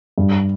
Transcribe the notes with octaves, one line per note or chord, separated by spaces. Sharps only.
G2